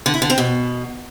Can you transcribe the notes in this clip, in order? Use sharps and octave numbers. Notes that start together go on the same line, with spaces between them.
D3
E4
D3
C4
B2